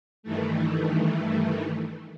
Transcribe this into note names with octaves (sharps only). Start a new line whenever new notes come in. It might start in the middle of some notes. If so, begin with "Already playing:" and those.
G2 D#3 E3 A3